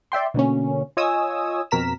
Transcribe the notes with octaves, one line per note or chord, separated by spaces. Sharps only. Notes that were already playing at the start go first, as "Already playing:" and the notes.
D5 E5 G5 C6
B2 D3 A#3 C#4
F4 C#5 D#5 G#5 D#6 E6
F2 B2 A#4 A#5 B6 E7